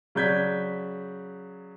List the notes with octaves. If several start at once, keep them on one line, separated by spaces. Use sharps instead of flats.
C#3 F#3 D5 G6 G#6 B6